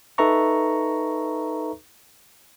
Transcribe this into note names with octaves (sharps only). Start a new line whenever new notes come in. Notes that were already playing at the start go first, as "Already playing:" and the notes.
D#4 A4 B4 E5 A#5 C#6